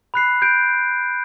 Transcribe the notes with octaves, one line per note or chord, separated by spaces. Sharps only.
B5 F#6 C7
G6 D7